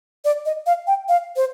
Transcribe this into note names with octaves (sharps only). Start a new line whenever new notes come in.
D5
D#5
F5
G5
F5
C5